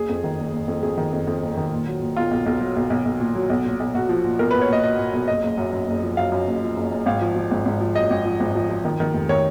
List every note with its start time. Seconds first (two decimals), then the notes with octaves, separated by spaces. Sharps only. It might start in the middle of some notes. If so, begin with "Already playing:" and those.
Already playing: F#1 G#4
0.09 F2
0.24 D#3
0.38 F#1
0.53 F#1
0.68 F2
0.83 F2 G#4
0.98 D#3
1.13 F2
1.27 F2
1.43 F#1
1.57 D#3
1.72 A#2
1.87 F#3
2.01 A#2
2.16 B1 F4
2.31 B1
2.46 B1
2.61 F#3
2.76 B1
2.90 B1
3.05 B1
3.20 A#2
3.35 F#3
3.50 B1
3.65 A#2
3.80 B1
3.94 B1 F#4
4.09 F3
4.24 A#2
4.39 B1 A#4
4.51 B4
4.54 B1
4.61 C#5
4.69 A#2 D#5
4.83 A#2 D#5
4.98 A#2
5.13 B1
5.28 F#1 D#5
5.43 F#1
5.58 F#2
5.72 F#2
5.88 F#1
6.03 F3
6.17 F#2 F5
6.32 F#2
6.47 F#1
6.62 F3
6.77 F#1
6.91 F#1
7.06 G#1 F5
7.21 F3
7.36 F3
7.51 G#1
7.65 G#1
7.80 F3
7.95 F#2 D#5
8.10 G#1
8.25 F3
8.40 G#1
8.55 F3
8.70 F3
8.85 D#3
9.00 D#3
9.14 F1
9.29 D#3 C#5